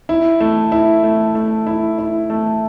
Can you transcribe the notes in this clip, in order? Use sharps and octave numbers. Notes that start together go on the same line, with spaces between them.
E4
A3
E4
A3
A3
E4
E4
A3